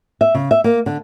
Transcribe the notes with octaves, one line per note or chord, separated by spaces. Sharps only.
E5
C#3
E5
A#3
D3